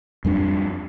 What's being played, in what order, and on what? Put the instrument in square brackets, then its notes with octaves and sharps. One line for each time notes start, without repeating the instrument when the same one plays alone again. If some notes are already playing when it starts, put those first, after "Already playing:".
[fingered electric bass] F2 G3 D4